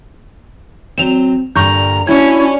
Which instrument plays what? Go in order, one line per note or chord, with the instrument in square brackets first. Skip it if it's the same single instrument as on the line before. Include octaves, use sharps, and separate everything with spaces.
[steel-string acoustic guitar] F#3 C4 [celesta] E7 F7
[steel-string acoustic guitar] G2 A#2 D3 [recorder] A#5 [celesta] C#6 G6
[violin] C#4 [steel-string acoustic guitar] D4 F#4 [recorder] E4 [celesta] G#6